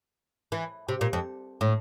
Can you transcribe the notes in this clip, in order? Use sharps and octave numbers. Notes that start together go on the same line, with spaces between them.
E3
C3
A#2
F2
A2